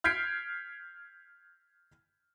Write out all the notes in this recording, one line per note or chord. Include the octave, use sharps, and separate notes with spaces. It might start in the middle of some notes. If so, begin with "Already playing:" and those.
F6 G6 G#6 B6 C7 D7